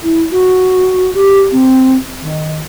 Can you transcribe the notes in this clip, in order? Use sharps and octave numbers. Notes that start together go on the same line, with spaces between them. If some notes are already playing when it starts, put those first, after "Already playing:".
E4
F#4
G4
C4
D#3